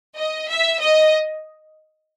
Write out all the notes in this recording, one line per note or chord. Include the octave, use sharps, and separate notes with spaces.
D#5
E5
D#5